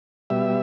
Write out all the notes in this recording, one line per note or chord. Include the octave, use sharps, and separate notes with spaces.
B2 G3 E5